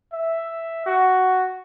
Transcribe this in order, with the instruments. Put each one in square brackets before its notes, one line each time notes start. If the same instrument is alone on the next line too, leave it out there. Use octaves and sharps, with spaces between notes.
[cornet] E5
F#4